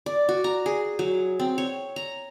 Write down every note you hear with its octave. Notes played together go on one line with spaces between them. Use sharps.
D5
F#4
A#5
G#4
F#3
C4
C#5
A#5